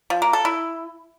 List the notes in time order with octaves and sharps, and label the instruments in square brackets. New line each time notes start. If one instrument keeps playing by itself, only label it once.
[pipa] F3
A#3
A4
E4